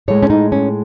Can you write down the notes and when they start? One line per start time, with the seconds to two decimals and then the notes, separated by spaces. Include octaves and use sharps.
0.08 A2 G#3 C#5
0.23 C#4
0.30 D#4
0.52 C#4